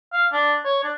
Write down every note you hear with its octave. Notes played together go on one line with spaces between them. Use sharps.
F5
D4
C#5
D4